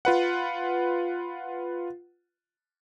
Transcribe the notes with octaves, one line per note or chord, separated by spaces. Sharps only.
F4 B4 F#5